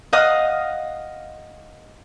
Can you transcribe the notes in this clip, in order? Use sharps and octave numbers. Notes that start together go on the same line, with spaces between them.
D#5 F5 F#5 D#6